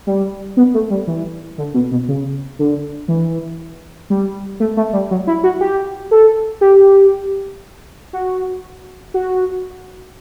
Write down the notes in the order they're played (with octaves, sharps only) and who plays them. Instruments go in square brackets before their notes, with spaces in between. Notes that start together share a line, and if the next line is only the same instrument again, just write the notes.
[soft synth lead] G3
B3
A3
G3
E3
D3
B2
B2
C#3
D3
E3
G3
A3
A3
G3
F#3
E4
F#4
G4
A4
G4
F#4
F#4